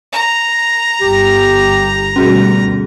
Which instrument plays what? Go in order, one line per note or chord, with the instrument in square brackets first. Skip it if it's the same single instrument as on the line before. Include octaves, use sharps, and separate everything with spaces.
[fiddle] A#5
[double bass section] G1 G2 [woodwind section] G4
[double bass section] D2 B2 G3 [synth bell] C#4 F#4 G#4